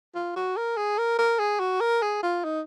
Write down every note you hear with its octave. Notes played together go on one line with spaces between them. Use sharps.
F4
F#4
A#4
G#4
A#4
A#4
G#4
F#4
A#4
G#4
F4
D#4